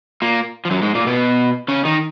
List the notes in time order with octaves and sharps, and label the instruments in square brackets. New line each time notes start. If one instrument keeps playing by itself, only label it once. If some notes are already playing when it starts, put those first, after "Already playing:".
[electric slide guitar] A#2 A#3
F3
F#2 F#3
G#2 G#3
A#2 A#3
B2 B3
C#3 C#4
D#3 D#4